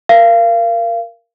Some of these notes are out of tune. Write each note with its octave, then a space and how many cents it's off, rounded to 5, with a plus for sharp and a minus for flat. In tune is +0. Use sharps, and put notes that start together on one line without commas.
A#4 +0 F5 -30